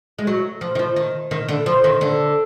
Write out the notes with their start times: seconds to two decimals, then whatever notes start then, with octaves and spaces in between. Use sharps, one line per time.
0.18 G#3
0.27 F#3
0.61 F3
0.75 D#3
0.79 F3
0.96 D#3
1.31 D#3
1.48 D3
1.66 F3
1.84 D#3
2.01 D3